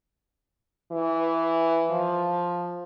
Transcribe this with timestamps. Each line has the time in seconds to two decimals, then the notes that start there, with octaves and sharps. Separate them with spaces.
0.92 E3
1.91 F3